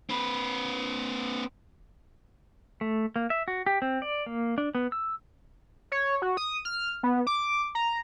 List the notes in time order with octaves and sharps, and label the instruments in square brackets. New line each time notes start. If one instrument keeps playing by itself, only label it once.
[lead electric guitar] C4 B4
[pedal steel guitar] A3
A#3
E5
F#4
G4
C4
D5
A#3
D4
B3
E6
[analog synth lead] C#5
F#4
D#6
F6
B3
D6
A#5